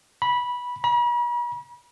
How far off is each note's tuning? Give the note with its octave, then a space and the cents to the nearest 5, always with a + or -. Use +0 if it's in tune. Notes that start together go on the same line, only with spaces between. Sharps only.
B5 -15
B5 -45